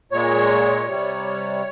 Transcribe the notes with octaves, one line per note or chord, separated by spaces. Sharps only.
A#2 G#3 C#5
C3 G3